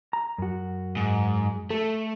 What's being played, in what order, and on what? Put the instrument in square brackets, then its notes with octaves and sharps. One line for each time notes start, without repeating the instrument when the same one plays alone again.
[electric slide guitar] A#5
F#2 F#4
[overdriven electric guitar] G#2
[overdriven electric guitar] A3 [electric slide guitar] A4